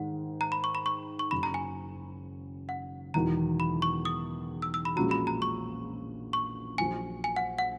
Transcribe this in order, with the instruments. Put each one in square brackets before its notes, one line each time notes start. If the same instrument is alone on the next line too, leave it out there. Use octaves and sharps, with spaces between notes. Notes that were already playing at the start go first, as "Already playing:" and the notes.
Already playing: [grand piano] G#2 D#3 G#3 [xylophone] F#5
[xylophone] A#5
B5
C#6
B5
C#6
C#6
[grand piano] F#1 F#2 C#3 [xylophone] B5
[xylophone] A#5
G#5
F#5
[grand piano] E1 E2 D#3 F#3 [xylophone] A#5
[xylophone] B5
C#6
D#6
E6
E6
B5
[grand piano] A#1 A#2 G#3 C#4 F#4 [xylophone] A#5
[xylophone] B5
A#5
C#6
C#6
[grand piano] A#1 A#2 F#3 [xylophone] G#5
[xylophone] G#5
F#5
F#5